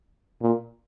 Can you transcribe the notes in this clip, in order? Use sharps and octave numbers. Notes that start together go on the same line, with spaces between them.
A#2